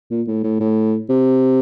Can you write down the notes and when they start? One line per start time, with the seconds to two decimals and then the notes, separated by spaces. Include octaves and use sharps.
0.11 A#2
0.28 A2
0.44 A2
0.60 A2
1.09 C3